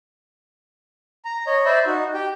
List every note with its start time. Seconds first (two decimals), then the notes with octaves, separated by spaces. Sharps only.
1.25 A#5
1.47 C#5 D#5
1.66 C5 D5 E5 B5
1.86 D#4 F#4
2.14 G4 G5